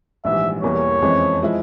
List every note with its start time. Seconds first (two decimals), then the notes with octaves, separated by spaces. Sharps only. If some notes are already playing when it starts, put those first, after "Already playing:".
0.25 A#1 G#2 E3 G3 E5
0.63 E1 E2 E3 G3 A#3 C#5
1.02 F2 C#3 E3 G#3 C4
1.42 F3 G#3 E4